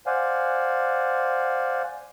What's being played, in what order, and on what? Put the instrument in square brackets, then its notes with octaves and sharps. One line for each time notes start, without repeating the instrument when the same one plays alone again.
[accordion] C5 D5 F5 F#5 G#5